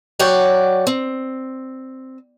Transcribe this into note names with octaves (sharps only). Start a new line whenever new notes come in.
F#3 C#5 D5 F#5 G5
C4